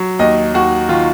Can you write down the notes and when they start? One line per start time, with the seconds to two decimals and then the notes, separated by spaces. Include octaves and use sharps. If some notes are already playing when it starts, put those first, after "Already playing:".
Already playing: F#3
0.19 D#2 D#5
0.54 D#2 F#4
0.89 D#3 F4